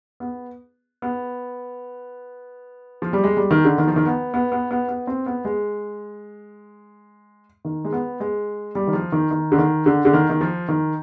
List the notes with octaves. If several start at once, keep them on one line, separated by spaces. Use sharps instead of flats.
B3
B3
F3
G3
G#3
G3
D#3
D3
D#3
F3
D#3
B3
B3
B3
B3
B3
C4
B3
G#3
D#3
G#3
B3
G#3
G3
D#3
F3
D#3
D#3
D3
D#3
D3
D3
D#3
D#3
F3
D#3